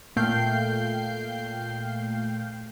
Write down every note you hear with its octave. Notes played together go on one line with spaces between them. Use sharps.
A#2 A3 F5 G5 G6 C7